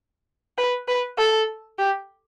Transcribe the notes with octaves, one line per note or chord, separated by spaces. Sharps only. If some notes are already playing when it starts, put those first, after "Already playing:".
B4
B4
A4
G4